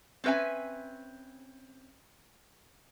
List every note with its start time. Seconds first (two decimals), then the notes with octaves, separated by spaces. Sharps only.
0.24 C4 C#4 B4 E5 G#5